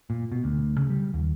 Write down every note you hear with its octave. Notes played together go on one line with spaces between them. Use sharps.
A#2
B2
D2
C#3
G3
D#2